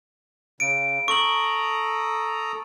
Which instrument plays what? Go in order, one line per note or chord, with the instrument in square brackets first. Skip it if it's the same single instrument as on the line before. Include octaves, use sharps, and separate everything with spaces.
[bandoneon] C#3 [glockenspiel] D7
[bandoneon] A4 A#5 D#6 [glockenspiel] C#6 F#7